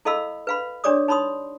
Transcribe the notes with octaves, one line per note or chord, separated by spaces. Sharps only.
E4 A4 D#5 F5 B5 E6
B4 F5 B5
D4 G4 C#5 D5 D6 D#6
D#4 C#5 B5 C6 D#6